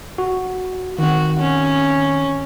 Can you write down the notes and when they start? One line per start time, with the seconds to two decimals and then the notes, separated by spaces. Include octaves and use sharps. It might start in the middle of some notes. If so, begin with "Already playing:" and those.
0.18 F#4
0.99 D#3 C4 F#4
1.40 C#4